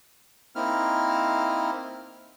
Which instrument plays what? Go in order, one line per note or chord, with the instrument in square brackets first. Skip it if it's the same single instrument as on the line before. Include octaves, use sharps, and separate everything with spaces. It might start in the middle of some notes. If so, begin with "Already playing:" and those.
[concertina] A#3 C4 D#4 E4 F6